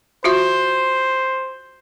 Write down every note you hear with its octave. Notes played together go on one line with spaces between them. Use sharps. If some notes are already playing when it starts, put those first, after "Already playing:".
F4 F#4 C5 E5